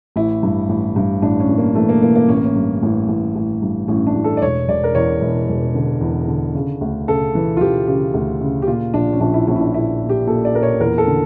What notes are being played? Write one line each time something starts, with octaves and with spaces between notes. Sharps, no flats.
A1 E4
G2
A1
G2
A1 D4
C#4
A1
A#3
E3 A3
A#3
E3 A#3
A#3
A1 C#4
A#3
C#4
G2
A1
A1
A1
G2
A1 C#4
D4
A1
A4
D5
E1 C#5
E1 D5
A#4
E2 C#5
E1
E1
D3
E2
D3
C#3
D2
C#3 A4
E3
F4
E3 G4
C#3 G4
D2
C#3
G4
A#2 F4
A#1 D4
C#4
A#1 D4
E4
A#1 C#4
E4
D4
A#2 E4
A#2
G4
A#2 A4
D5
A#2 A#4
C#5
E2 A#4
A4
D3